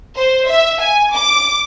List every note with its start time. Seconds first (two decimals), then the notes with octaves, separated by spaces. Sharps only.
0.16 C5
0.49 E5
0.80 G#5
1.13 D6